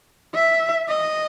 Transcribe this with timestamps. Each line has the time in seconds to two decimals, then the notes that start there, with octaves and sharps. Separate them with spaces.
0.35 E5
0.89 D#5